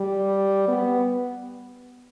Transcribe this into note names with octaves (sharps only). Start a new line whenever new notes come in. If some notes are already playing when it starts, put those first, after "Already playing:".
Already playing: G3
B3